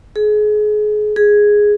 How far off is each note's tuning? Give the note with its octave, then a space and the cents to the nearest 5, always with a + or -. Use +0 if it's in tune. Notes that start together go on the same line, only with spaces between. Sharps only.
G#4 +30
G#4 +0